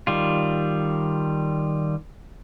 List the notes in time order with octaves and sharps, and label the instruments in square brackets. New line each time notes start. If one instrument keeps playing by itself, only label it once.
[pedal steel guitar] D#3 G3 F4